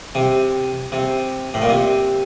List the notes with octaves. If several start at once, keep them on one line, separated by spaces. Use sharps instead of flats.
C3
C3
A2
A#2
C3